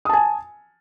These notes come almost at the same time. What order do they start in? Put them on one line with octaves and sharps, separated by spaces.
D#6 A5 G#5